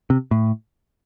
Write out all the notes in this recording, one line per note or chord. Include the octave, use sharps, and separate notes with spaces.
C3
A2